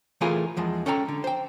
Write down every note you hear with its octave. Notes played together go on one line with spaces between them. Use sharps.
E3 A3 C4 F4 G#4 A#4
E2 F3 G#3
C#4 A4 D5 G5 A#5
D3
C5 G5